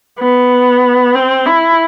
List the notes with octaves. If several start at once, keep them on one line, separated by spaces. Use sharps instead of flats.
B3
C4
E4